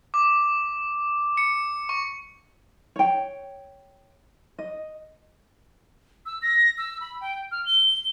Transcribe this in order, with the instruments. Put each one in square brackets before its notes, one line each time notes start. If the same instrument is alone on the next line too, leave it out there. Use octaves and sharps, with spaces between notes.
[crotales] D6
C#7
C#6
[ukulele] C#5 G5
D#5
[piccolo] E6
A#6
E6
B5
G5
F6
G7